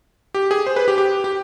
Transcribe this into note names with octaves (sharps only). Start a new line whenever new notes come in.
G4
G#4
C5
B4
G4
G4
G4